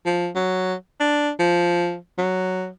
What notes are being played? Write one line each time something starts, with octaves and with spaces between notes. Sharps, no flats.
F3
F#3
D4
F3
F#3